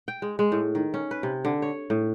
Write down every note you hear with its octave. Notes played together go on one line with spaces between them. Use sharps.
G5
G#3
G#3
A2
D#3
C#4
B4
C3
D3
C#5
A2